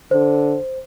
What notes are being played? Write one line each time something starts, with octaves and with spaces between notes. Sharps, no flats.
D3 C5